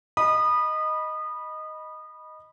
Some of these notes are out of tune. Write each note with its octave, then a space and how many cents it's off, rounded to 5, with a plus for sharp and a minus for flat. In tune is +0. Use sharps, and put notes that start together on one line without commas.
D#5 +0 B5 -15 D#6 -25